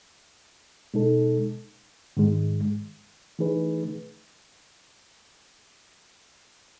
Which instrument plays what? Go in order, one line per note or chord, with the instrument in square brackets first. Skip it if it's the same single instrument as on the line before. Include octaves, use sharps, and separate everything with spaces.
[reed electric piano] B2 G#3 D#4 A4
G#2 D#3 G#3
E3 A3 D#4 G#4 B4